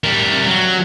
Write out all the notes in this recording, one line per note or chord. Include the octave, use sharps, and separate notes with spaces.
G3 A#4
F#3